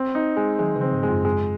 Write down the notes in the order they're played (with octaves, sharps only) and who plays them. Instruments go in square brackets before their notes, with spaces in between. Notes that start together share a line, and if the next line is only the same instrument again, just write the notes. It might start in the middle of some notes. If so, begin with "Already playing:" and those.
Already playing: [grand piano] C4
D#4
G#3
[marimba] D#3 F#3 [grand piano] G#3
[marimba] C#3 F3
[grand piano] C4
[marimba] G#2
[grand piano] G#3
[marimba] F#2
[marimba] F#2 [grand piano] G#3